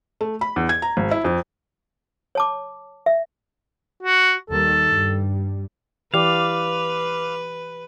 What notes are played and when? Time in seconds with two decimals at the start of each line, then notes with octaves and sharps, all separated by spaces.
0.21 A3
0.41 B5
0.56 E2
0.69 G#6
0.82 A#5
0.97 G#1
1.11 E4
1.25 F2
2.35 C#5 A5 D6
3.06 E5
4.03 F#4
4.50 D#2 D#3 G3 A4
4.86 G2 G3
6.14 E3 G4 B4 D5 F5 D6